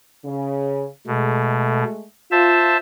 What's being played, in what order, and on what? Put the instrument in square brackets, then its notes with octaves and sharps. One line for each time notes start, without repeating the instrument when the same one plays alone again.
[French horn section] C#3
[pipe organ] B2 [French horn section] G#3 A3
[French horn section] F4 [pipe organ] C5 E5 A5